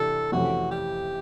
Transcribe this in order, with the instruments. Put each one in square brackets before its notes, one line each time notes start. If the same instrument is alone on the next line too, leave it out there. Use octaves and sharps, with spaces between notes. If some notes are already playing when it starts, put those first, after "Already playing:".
Already playing: [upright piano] C3 E3 D4 [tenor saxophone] A4
[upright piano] F2 C3 E3 A3 C#4 [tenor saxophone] F#4
[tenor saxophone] G4